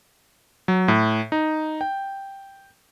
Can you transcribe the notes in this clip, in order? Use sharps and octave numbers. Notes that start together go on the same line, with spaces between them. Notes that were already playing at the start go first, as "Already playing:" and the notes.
F#3
A2
D#4
G5